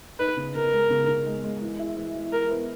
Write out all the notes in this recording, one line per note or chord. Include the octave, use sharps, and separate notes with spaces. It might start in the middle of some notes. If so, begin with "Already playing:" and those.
D#4 B4
C#3
C#3 A#4
G#3
C#3
C#3
G#3
G#3
E3
E4
E3
E3
E3 A#4
B3